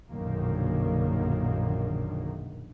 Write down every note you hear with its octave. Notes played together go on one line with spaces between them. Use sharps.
A#1 F#2 B2 D3 D#3 A#3